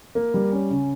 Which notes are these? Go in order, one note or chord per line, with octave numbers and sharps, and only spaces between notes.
A#3
G3
C#4
C#3